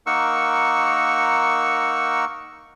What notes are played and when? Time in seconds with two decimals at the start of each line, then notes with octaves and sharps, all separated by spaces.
0.06 A#3 D#4 A#4 F#5 C#6 E6